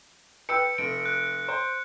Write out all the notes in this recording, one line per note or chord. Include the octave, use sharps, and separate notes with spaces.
B4 G5 E6 C#7
F1 D7
F#6
C5